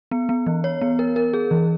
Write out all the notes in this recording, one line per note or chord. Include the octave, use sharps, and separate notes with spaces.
B3
B3
E3
C#5
B3
A#4
A#4
G#4
E3